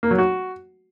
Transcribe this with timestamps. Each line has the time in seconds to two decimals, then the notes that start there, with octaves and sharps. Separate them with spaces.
0.03 A#3
0.11 F#3
0.18 F#4